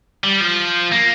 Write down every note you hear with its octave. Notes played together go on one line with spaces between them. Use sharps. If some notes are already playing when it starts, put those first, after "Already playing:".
G3
F3
A#3